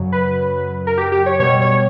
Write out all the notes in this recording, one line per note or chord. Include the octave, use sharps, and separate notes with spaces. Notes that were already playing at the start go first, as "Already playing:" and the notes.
Already playing: F#2 C#3 F#3
B4
A#4
G4
G4
C#5
B2 G3 C#5
C#5